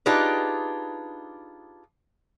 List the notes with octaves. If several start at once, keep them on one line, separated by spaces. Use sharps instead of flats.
D4 D#4 F4 G4 G#4 B4